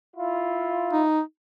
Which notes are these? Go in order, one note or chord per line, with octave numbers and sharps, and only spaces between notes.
E4 F4
D#4